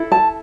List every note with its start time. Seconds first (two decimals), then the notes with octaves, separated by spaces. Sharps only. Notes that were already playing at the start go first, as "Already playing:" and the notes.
Already playing: E4 A4
0.12 A5